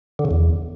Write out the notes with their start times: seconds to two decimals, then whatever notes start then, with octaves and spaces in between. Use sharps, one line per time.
0.19 D3
0.25 C#3
0.31 E2